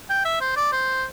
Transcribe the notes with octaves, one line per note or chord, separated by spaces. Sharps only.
G5
E5
C5
D5
C5